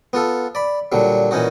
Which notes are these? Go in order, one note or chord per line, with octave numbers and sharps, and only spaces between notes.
B3 F4 A4
D5 B5
A#2 D3 F#3 G3
A#2 E3 C#4 D#4 F#4